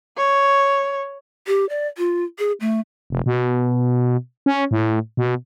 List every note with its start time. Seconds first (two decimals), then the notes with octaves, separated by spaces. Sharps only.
0.17 C#5
1.47 G4
1.69 D5
1.98 F4
2.39 G#4
2.60 A3
3.10 F1
3.26 B2
4.46 C#4
4.71 A2
5.17 B2